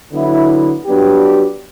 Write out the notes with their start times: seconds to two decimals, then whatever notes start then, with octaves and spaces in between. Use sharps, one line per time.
0.11 D3 F#3 B3 E4
0.85 F#3 B3 D4 G4